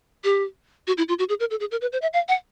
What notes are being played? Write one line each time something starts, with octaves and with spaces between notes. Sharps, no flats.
G4
F#4
E4
F4
F#4
G#4
A#4
A4
G#4
A#4
B4
C5
E5
F5
F#5